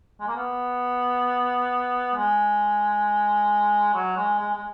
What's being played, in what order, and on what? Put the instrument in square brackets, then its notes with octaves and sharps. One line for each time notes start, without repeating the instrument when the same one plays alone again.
[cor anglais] G#3
A#3
B3
G#3
F#3
G#3
G#3
G#3